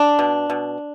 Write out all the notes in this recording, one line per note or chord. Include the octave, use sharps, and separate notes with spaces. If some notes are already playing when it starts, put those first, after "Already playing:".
Already playing: D4
B2
B2